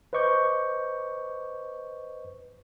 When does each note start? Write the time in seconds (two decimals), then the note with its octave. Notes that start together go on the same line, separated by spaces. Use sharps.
0.13 B4 C5 D#5 C#6 D6 G6